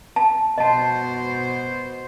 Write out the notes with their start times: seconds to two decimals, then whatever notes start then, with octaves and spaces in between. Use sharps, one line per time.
0.16 A5
0.58 B2 C5 D#5 A5